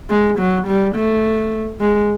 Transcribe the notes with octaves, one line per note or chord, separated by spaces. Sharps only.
G#3
F#3
G3
A3
G#3